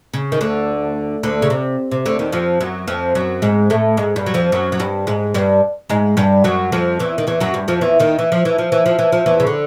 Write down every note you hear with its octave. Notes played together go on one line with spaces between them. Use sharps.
C#3
D#3
D2 D3
D2 D3
C#3
C3
C3
D2 D3
D#2 D#3
F2 F3
F#2 F#3
F2 F3
F#2 F#3
G#2 G#3
A2 A3
G#2 G#3
G2 G3
F#3
F2 F3
F#2 F#3
F#3
G2 G3
G#2 G#3
G2 G3
G#2 G#3
G2 G3
F#2 F#3
F2 F3
E2 E3
D#3
E2 E3
F#2 F#3
G2 G3
F2 F3
E2 E3
D#2 D#3
E3
F3
E3
F3
E3
F3
E3
F3
E2 E3
C#3
D3